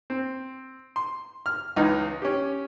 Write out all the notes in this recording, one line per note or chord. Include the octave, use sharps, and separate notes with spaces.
C4
C6
F6
C#2 E3 D#4 F6
C#4 G4